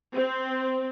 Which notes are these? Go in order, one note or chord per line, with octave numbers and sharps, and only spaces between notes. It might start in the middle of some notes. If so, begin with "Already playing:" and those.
C4